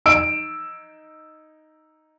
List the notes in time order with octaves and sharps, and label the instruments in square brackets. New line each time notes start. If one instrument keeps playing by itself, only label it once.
[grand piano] D#4 E6 D7